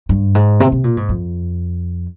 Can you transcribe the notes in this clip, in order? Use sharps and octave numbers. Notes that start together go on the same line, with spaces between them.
G2
G#2
C3
C3
A#2
G#2
F2